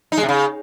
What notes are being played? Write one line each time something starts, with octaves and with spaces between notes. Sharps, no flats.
D#4
G#3
C3
C#3